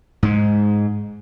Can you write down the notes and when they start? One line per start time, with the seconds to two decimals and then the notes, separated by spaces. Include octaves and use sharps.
0.23 G#2 G#3